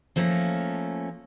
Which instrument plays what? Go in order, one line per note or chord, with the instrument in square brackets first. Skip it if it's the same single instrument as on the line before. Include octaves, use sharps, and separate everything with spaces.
[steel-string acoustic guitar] F3 A3 A#3 C#4